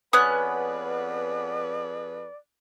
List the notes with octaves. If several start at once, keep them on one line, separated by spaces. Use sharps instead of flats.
F2 B3 C#4 G#4 B4 D5 D#6 F#6